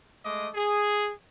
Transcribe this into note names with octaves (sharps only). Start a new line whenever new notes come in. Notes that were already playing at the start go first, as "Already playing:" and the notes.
G#3 A3 D#5 D6
G#4